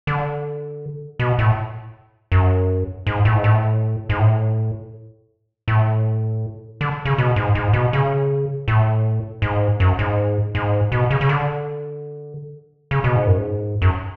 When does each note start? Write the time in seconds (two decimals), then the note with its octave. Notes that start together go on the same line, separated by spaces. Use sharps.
0.07 D3
1.19 B2
1.39 A2
2.32 F#2
3.07 G#2
3.25 A2
3.35 G#2
3.44 A2
4.09 G#2
4.19 A2
5.68 A2
6.81 D3
7.05 C#3
7.18 B2
7.36 G#2
7.55 G#2
7.73 B2
7.93 C#3
8.68 A2
9.42 G#2
9.80 F#2
9.99 G#2
10.55 G#2
10.92 B2
11.11 C#3
11.21 C#3
11.29 D3
12.91 C#3
13.04 B2
13.16 G#2
13.27 F#2
13.38 G#2
13.82 F#2